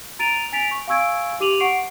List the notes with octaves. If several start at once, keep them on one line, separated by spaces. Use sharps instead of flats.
A#5 A6 D7 D#7 F7
G#5 A6 B6 D7 F7
C#6
F5 G#5 C#6 E6 G#6 D7
G4 D6 D#7 F7 F#7
F#5 C#6 C7 D7